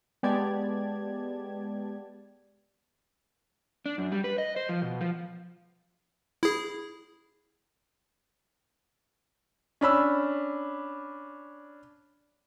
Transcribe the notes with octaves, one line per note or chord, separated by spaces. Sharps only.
G#3 B3 G4 D5 A5 G#6
D4
F#2
G3
B4
D#5
C5
F3
B2
F3
E4 G#4
C#4 D4 B5 E6